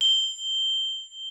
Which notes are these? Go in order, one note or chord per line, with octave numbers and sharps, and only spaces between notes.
G7